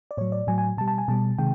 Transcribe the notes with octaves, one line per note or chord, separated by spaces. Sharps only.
D5
A2 F#3 C#5
D5
A2 F#3 G#5
G#5
B2 G3 A5
A5
G#5
B2 G3 A5
C3 D#3 G#3 G5